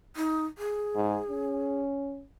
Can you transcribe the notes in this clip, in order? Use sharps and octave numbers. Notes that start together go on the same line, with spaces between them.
D#4
G#4
G#2
C#4